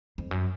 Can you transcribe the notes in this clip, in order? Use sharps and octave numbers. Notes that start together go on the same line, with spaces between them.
F2
F#2